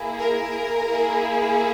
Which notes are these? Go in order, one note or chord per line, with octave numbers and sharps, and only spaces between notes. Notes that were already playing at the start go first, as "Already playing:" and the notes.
Already playing: A#3 E4 G#4
A#4
A#3 E4 G#4